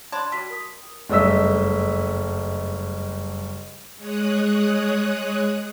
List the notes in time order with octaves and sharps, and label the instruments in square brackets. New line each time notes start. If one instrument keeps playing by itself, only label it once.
[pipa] D4 [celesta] B5 C6 G#6
[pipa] G3 [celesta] F#4 B6
[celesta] A#4 D#6
[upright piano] F#1 G2 A3 D#5 E6 B6
[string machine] G#3 C#5 D#6 F#6